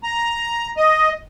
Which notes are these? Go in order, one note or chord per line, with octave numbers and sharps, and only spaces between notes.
A#5
D#5